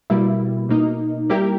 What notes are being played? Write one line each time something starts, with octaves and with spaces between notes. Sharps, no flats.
B2 G3 A#3 E4
B2 A#3 D#4
G3 A#3 E4 G4 A#4